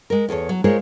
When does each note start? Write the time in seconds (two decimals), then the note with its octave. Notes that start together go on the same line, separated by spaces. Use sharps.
0.10 G#3 A#4
0.29 E2 G#4 A4 C#5
0.49 F#3
0.64 G#3 F4 G#4 A#4 C5 C#5